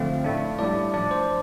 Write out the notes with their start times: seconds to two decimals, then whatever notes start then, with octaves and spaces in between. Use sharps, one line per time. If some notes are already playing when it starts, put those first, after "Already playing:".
Already playing: D3 F3 A3 C4 F5
0.24 A2 A3 D4
0.59 A2 G3 D4 D5
0.94 F3 D4 D5
1.11 C5